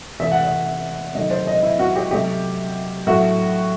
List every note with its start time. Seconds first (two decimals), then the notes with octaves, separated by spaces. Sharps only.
0.20 C3 E3 A3 E5
0.31 F#5
0.44 E5
1.15 C3 D#3 F#3 A3 D#5
1.31 C5
1.47 D#5
1.63 E4
1.79 F#4
1.96 G4
2.11 C3 F#3 A3 G4
3.07 A2 F#3 A3 F#4